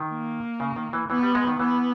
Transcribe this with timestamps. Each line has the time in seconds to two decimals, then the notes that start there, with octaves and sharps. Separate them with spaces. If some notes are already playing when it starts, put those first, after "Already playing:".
Already playing: D#3
0.10 A#3
0.60 C#3
0.76 D#3
0.93 E3
1.10 E3 B3
1.23 G3
1.35 G#3
1.47 D#3
1.60 E3 B3